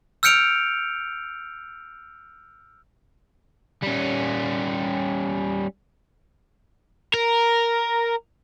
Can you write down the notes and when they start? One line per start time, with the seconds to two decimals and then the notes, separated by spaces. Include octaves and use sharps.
0.23 E6 F6 G6 C#7 D7 F7
3.82 G3 C#4
7.14 A#4